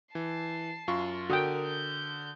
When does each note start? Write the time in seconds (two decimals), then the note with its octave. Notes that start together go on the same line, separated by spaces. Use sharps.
0.15 E3 A5 C7
0.88 F#2 F4 C#6
1.30 D3 F#4 A#4 G5 D#6
1.66 G6